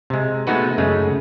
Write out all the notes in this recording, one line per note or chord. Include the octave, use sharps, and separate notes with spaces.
C3 G#3
G#3 A3 B3 D#4 F#4 B4
F#2 C#3 G#3 A3